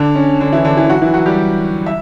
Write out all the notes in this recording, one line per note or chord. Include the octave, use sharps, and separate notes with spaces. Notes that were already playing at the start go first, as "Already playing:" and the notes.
Already playing: D3 D4
C#4
D3 D4
E3 E4
D3 D4
E3 E4
F#3 F#4
E3 E4
F#3 F#4
G3 G4
E5